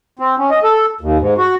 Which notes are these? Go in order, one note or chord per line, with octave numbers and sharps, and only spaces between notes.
C4
C#4
D#5
A4
D#2
G#2
F#4